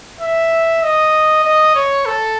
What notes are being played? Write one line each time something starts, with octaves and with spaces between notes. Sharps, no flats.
E5
D#5
D#5
C#5
A4